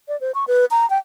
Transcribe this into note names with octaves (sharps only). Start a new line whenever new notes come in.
D5
C5
C#6
B4
A#5
G5